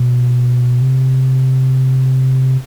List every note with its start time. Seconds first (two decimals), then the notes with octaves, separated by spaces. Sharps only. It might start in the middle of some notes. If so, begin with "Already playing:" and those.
Already playing: B2
0.82 C3